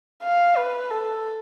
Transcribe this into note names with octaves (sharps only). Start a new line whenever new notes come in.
F5
B4
A4